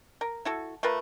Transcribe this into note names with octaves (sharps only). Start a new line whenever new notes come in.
A#4
E4 F#4 A4
A3 F4 A#4 B4